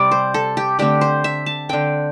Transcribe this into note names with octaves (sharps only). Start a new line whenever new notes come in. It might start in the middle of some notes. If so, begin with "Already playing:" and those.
Already playing: C3 G3 C4 D5
C5
A4
G4
D3 A3 C4 G4
C5
E5
A5
D3 C4 G5